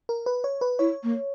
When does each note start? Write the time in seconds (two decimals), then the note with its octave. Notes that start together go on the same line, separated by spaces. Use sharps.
0.09 A#4
0.26 B4
0.44 C#5
0.61 B4
0.79 E4 C#5
1.03 A#3